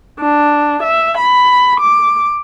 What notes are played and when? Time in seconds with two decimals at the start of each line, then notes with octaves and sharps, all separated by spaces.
0.20 D4
0.83 E5
1.18 B5
1.80 D6